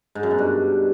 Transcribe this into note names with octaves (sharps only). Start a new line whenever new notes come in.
G#2
F#2
B2
G2